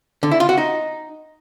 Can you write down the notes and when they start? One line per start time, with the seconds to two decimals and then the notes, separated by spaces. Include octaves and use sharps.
0.23 D3
0.31 E4
0.40 F4
0.49 F#4
0.58 D#4